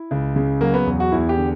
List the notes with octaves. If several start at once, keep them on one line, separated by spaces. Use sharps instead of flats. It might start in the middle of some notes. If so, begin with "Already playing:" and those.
Already playing: E4
C#2
C#3
F#3 A#3
B3
E2
F#4
E2 E4
G4
D3